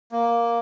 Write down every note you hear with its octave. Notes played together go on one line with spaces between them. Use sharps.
A#3